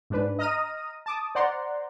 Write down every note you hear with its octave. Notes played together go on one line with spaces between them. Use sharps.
G#2 D4 B4
D#5 A#5 D#6 F6 A#6 D#7
A5 D6 D#6
C5 D5 F#5 A#5 C6